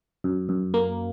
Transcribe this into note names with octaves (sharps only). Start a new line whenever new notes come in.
F#2
F#2
A#3